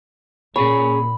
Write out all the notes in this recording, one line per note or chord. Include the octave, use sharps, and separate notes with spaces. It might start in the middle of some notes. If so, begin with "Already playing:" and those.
A#2 C#4 G#4 C#5 B5